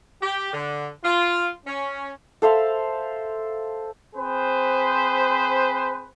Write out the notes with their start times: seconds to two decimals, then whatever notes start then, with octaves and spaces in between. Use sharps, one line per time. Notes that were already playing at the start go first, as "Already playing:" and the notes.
0.21 G4
0.52 D3
1.04 F4
1.66 C#4
2.42 A4 C5 E5 F5
4.16 C4 G#4 B4 C5